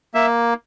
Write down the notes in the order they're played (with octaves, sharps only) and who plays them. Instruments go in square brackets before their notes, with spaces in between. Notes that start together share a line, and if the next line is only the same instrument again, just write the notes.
[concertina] A#3 E5